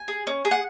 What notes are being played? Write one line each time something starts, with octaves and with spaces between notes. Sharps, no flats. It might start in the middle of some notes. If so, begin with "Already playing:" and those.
Already playing: G#5
G#4
C#4
G#4
F#5